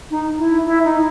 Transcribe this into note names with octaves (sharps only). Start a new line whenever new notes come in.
D#4
E4
E4
D#4